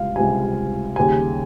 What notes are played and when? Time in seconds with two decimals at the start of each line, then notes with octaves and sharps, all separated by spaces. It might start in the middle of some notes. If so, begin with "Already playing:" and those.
Already playing: C#2 C3 G3 F5
0.16 C#2 C3 G3 G#5
0.96 D#2 C#3 G3 G#5